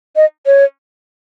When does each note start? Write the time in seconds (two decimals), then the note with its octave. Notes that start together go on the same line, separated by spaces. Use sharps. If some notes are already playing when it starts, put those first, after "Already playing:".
0.16 D#5
0.46 C#5